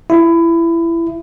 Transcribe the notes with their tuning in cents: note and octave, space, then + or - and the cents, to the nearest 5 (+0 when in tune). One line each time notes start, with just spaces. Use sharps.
E4 +20